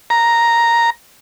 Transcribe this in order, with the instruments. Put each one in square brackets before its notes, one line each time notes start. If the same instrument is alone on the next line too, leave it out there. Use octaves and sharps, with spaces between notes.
[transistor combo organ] A#5